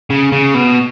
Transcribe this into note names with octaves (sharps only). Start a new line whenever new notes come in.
C#3
C#3
B2